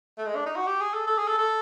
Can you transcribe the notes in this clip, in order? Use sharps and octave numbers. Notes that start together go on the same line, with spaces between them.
A3
G#3
D4
D#4
F#4
G4
G#4
A4
A4
G#4
A4
A4